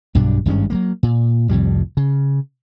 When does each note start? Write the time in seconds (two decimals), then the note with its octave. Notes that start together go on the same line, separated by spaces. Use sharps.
0.15 B1 G2 B2 D4
0.46 G#1 G2 G#3 C#4
0.70 F#3 G#3 A#3
1.03 A#2
1.49 C2 F2 A2 G3
1.97 C#3